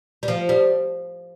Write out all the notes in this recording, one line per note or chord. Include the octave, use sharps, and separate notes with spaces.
G3
F3
G3